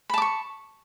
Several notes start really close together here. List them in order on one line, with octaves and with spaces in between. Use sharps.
B5 A5 D6 C#6